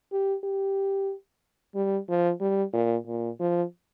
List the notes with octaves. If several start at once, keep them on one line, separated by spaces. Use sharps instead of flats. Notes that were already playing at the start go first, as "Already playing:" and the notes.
G4
G4
G3
F3
G3
A#2
A#2
F3